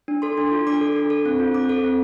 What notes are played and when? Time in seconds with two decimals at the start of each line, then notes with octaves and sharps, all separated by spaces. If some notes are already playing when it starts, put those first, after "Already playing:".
0.08 D4
0.22 A4 C6
0.37 D4
0.52 F4
0.67 D4 D6
0.81 A4
0.96 D4
1.10 A4
1.26 C4
1.39 F4
1.54 C4 D6
1.69 A4
1.84 C4